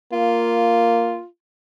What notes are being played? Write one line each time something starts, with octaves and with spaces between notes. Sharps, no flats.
A#3 F4